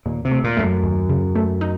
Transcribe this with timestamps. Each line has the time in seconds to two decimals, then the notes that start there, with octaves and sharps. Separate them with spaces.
0.06 D#2 A#2
0.25 C3
0.31 A3
0.44 A#2
0.57 F2 A3
0.64 F#2
0.83 D#2
1.09 C#3
1.36 A3
1.61 D#4